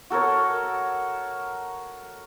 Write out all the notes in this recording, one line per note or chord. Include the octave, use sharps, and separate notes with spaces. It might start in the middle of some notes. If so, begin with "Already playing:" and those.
F#4 A4 A#4 C#5